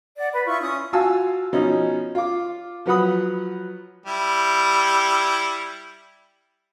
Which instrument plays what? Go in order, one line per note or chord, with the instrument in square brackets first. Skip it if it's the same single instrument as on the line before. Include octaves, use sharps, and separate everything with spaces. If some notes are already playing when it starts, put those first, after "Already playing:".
[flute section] D5 F#5
B4 B5
E4 F4 C#6
C#4 D#6
[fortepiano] F4 F#4 F5 G#5 A5 E6
B2 F3 C#4 D#4
F4 D6
F3 F#3 B4 F#5 B5 D#6
[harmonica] G3 E4